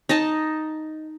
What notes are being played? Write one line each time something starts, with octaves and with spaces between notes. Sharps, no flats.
D#4 D#5 A5